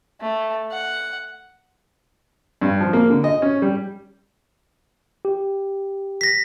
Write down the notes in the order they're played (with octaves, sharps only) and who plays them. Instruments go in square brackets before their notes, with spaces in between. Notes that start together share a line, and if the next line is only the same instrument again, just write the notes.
[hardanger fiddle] A3
F#5
[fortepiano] G2
F3
A#3
D3
D#5
C#4
G3
[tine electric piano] G4
[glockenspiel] A#6 B6